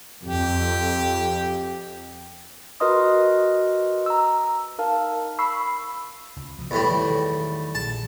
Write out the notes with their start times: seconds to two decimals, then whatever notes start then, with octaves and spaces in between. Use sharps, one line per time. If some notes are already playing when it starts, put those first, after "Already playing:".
0.25 F2 G4
2.80 F#4 A#4 B4 D#5 C6 D#6
4.06 A#5 E6
4.78 D#4 A#4 F5 A5
5.39 B5 C#6 E6 C7
6.36 C#2
6.59 B2 F3
6.71 E2 A2 G3
6.91 D#3 F#3
7.75 A#1 A5